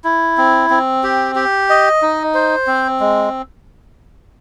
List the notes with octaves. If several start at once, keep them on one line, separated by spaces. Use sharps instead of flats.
E4
C4
C4
G4
G4
D#5
D#4
C5
C4
G#3